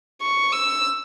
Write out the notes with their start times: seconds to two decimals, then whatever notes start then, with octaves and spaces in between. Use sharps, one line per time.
0.22 C#6
0.53 E6